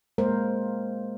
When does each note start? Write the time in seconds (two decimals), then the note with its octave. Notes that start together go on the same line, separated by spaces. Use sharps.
0.18 G#3 A#3 A#4 C5